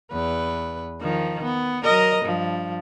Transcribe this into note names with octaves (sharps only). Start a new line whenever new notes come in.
E2 B4
D#3 F3
B3
F#3 A#4 D#5
G2 F3